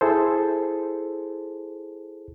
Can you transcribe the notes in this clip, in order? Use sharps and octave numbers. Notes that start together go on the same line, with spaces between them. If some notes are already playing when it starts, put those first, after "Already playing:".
E4 G#4 A4 C5